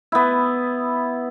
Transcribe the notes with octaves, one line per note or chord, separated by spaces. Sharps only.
B3 E4